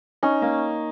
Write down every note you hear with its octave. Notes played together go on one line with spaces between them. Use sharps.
C#4 D#4
A#3